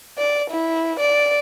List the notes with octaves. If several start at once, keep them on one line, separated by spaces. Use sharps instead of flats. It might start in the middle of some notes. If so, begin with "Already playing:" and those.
D5
E4
D5